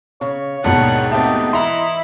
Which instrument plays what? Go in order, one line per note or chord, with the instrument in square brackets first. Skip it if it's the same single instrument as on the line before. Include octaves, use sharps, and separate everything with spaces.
[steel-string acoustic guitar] C#3 [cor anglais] C#5
[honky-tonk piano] D#2 G#2 B2 [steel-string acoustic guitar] D3 [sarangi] F#5
[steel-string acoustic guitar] A3 B3 C4 [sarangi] G4 [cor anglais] D#5
[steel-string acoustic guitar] E3 [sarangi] E4 [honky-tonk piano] A#5 C6